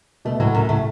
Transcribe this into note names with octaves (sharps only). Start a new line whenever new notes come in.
B2 A3
A2 F#3
F#2 A2
A2 A3